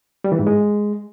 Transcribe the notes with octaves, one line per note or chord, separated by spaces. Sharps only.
G3
E3
G#2
G#3